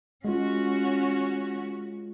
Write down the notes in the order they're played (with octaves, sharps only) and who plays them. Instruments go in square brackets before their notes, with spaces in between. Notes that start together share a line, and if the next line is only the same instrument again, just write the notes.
[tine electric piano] G#3 F4 [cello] C#4 F#4